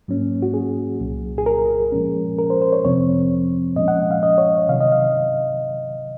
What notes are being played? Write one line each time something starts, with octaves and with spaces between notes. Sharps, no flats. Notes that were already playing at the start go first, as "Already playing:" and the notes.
G#2 F#3 A#3 C#4
F#4
G#4
C2 A#2 F#3
G#4
A#4
A#2 F3 G#3 C#4
A#4
C5
C5
C#5
F2 C3 F3 C4 C#5
A#2 F3 G#3 C#4 D#5
F#5
F5
D#5
C#5
C3 D#3 F#3 F5
D#5
F5